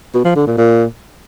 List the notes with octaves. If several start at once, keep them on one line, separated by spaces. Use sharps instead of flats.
B2
F3
D3
A#2
A#2